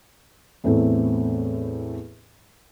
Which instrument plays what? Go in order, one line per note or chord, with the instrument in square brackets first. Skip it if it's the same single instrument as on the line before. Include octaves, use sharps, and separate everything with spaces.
[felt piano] E2 A2 A3 C4